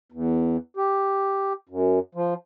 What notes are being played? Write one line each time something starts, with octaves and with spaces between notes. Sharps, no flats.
E2
G4
F#2
F3